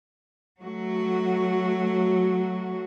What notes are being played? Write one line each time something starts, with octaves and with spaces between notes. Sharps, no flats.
F#3 A3 F#4